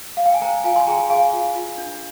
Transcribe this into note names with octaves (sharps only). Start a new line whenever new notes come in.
F5
G5
G#5
C5 G5 A#5
F4 F5 G#5
G#5 C6
G#4 G5 A#5
G#4 F5 G#5
F4
F4
D4